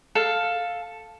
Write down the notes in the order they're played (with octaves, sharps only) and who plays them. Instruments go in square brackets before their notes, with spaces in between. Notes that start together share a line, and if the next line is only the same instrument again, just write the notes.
[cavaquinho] A4 F5